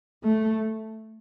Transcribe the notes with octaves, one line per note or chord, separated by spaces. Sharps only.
A3